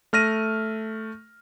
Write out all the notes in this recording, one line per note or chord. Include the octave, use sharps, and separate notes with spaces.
A3 F6 A#6 D#7